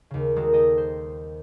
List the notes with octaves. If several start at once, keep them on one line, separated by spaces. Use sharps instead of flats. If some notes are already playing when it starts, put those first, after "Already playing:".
D#2 C#3
D#3 G3 G#3 F#4 A4 A#4
A4 D#5 G5 D#6
C5